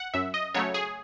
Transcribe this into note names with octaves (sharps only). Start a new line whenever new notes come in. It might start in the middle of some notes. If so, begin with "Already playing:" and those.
Already playing: F#5
F#2 E5
D#5
C#3 F#3 A3 C#5
G#4